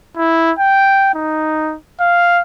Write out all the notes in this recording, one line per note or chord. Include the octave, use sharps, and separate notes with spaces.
E4
G5
D#4
F5